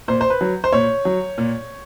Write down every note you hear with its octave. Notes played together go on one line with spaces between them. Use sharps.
A#2 C5
C5
B4
F#3
C5
A#2 C#5
F#3
A#2